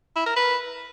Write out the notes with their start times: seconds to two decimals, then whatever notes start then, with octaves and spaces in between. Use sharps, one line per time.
0.16 E4
0.26 A#4
0.37 B4